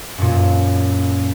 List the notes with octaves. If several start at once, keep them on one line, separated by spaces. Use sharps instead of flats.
F#2 A#2